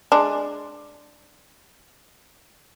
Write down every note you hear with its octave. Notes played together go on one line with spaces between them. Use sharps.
G#3 D4